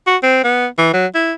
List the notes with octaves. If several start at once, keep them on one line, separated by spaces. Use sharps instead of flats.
F#4
C4
B3
E3
F#3
E4